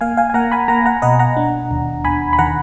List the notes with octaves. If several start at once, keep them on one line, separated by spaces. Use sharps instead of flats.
A#3 F5 G#5
F5 G#5
G#5
A#3 F#5 A#5
G#5 B5
A#3 F#5 A#5
F#5 A#5
B2 D#5 F#5
F#5 A#5
D4
D#2
D#2 G#5 B5
B5
D#3 F#5 A#5